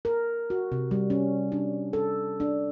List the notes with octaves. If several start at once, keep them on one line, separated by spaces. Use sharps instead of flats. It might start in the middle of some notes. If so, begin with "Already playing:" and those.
A#4
F#4
C3
G3
C#4
D4
A4
D4